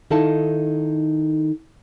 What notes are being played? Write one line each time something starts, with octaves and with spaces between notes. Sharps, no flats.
D#3 D#4 E4 A4 F5 A5